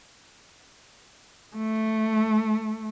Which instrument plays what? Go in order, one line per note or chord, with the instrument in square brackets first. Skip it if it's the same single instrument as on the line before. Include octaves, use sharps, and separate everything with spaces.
[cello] A3